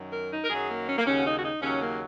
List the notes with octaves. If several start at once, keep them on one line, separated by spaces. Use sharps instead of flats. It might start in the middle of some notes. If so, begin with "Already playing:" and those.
Already playing: F#2 D#3 F#3
A#4
D#4
A#4
F#2 D#3 F#3 G#4
A#3
C#4
A#3
D#2 C#3 F#3 C#4
F#4
D#4
F#4
D#4
D#2 C#3 F#3 C#4
A#3